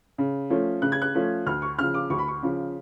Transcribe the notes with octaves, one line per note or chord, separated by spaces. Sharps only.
C#3
F3 A3 C#4
C#3 F#6
G#6
F#6
F3 A3 C#4
D2 F6
C#6
C#3 F3 F6
D6
D2 C#6
B5
C#6
C#3 F3